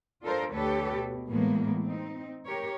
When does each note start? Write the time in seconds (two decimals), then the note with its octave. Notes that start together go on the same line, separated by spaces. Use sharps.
0.23 D4 F4 A4 A#4 C5
0.54 D2 D3 G4 A4 B4 C#5
0.95 B2
1.28 A2 E3 G#3 A#3 B3
1.82 C4 D#4
2.47 G4 A#4 C#5